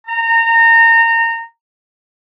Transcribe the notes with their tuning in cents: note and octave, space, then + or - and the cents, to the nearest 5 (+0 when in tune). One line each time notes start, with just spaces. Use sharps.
A#5 -25